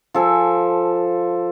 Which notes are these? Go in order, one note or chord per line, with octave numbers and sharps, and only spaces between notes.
F3 A4 G#5